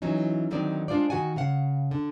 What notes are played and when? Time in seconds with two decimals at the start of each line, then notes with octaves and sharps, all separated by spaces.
0.02 E3 F#3 C#4 D#4
0.51 D3 D#3 F#3 C4 D#4 D5
0.88 G#3 D4 F4 C5 D5
1.10 D#3 F#4 F#5 G#5
1.36 C#3 F5 F#5
1.91 D3